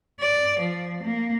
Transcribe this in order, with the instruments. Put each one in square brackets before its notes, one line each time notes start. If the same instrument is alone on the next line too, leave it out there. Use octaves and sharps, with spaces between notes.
[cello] D5
F3
A#3